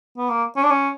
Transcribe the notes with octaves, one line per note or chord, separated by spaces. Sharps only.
B3
A#3
C#4
D4
C#4